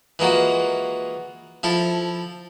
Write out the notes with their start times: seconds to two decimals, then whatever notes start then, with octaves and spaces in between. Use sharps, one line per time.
0.19 E3 G#3 A#3 F4 F#4
1.63 F3 E4 A4